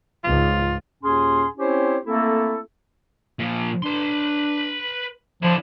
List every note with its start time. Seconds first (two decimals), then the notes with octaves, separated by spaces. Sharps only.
0.24 C#2 G#2 F4
1.02 D#2 A#2 C#4 G#4 G#5 C6
1.57 C4 C#4 E4 G4 C5 C#5
2.05 A3 A#3 C4 E4 A4
3.39 A#2 F3
3.83 D4 B4 C6
5.43 D3 F3 E4